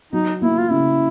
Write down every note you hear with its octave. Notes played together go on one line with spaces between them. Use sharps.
F#3 D#4
A#3 E4
F4
C#3 E4